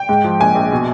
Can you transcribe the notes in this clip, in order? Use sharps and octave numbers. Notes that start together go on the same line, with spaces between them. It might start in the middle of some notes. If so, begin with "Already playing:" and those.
Already playing: G5
G#2
F3
A#1 G#5
A#1
B2